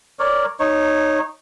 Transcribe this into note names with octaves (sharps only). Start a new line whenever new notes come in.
A#4 C#5 D5
D#4 C#5